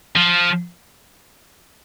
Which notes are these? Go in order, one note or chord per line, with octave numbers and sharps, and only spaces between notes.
F3